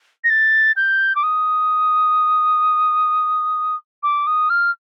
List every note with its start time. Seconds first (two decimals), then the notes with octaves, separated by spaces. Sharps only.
0.24 A#6
0.30 A6
0.76 G6
1.15 D6
1.23 D#6
4.03 D6
4.27 D#6
4.50 F6